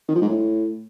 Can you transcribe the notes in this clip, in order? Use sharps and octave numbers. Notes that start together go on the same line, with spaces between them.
D#3
F3
G#2
A2